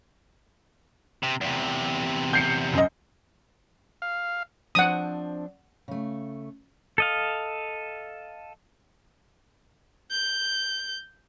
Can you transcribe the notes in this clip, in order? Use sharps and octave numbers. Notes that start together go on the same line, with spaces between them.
C3
E2 C3
G6 C7 C#7
F#2 D#5
F5
F3 C4 D4 F#5 D#6
C#3 A3
A4 D#5 F5
G6